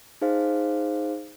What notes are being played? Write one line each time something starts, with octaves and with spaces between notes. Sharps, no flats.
D#4 G#4 C5 F5